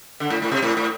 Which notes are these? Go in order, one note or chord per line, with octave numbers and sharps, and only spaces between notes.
D3
A2
A2
C3
A2
A2